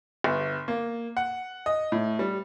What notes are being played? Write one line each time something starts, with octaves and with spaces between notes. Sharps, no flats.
G1
A#3
F#5
D#5
A2
G3